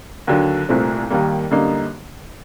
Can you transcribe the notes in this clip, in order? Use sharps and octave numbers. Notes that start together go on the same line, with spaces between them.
D#2 D3 F#3
C2 A#2 A3 C4
D#2 D#3 G3 A#3
F#2 D3 G3 A#3 D#4